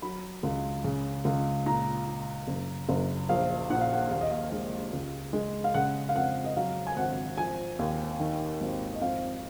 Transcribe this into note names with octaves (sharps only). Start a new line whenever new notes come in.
F#3 B5
C#2
C#3
C#2
A#2 A#5
A#2
F#1
F#1
A#1 F5
A#2 F#5
F5
F#5
D#2 F5
D#5
F5
G#3
C#2
G#3
F5
C#3 F#5
F5
F2 F#5
D#5
F#3 F5
G#5
G#1 F#5
F3 G#5
D#2
D#3
G#1
D#5
F2 F5